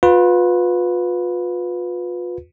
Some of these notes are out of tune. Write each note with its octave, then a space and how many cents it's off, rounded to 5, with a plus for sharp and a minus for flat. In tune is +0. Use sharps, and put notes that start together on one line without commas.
F4 +35 B4 +0